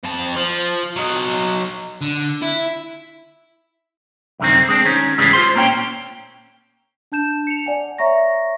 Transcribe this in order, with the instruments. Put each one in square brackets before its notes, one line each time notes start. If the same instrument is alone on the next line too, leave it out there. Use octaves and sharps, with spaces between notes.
[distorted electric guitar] F2 A5
F3
F#3 D#5
D3
E4
[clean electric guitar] C2 F#2 D3 D#3 C4
G#3 C4 D4
D#3 C#4
G#2 C#3 E3 G3 G#3 C#4
F4 C5 C6
A#2 A#3 C4 C#4 C#5 G5
[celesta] D4 A5 G6 E7
C#7 F7
D5 F#5 G#5
C#5 E5 A#5 C#6 A#6